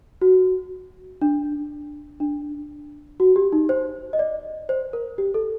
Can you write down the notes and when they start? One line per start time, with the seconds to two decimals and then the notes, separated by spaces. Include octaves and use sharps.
0.22 F#4
1.22 D4
2.20 D4
3.20 F#4
3.36 G4
3.52 D#4
3.69 C5
4.13 D#5
4.19 D5
4.69 C5
4.93 A#4
5.18 G4
5.34 A4